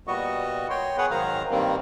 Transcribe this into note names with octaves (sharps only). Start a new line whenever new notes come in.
A#2 G3 B3 F#4 D#5 C#6
C#5 G5 C6
B3 G#4 B4 C#5 F#5
G#2 D#3 F#3 C5 F5 A#5
G2 D#3 G3 A#3 C4